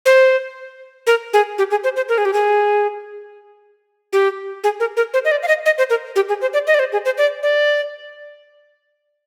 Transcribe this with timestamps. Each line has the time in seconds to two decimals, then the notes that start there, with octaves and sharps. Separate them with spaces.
0.06 C5
1.07 A#4
1.33 G#4
1.58 G4
1.71 G#4
1.84 C5
1.96 C5
2.09 A#4
2.18 G#4
2.25 G4
2.33 G#4
4.13 G4
4.64 G#4
4.80 A#4
4.97 A#4
5.14 C5
5.25 D#5
5.31 D5
5.43 F5
5.48 D#5
5.66 D#5
5.78 C5
5.90 A#4
6.16 G4
6.29 G#4
6.41 C5
6.54 D5
6.67 D#5
6.74 D5
6.79 C5
6.92 G#4
7.05 C5
7.18 D5
7.43 D5